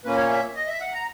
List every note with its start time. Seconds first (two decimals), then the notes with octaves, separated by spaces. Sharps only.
0.04 A#2 A#3 C#4 B4
0.17 C#5
0.30 E5
0.55 D#5
0.67 E5
0.80 F#5
0.93 A#5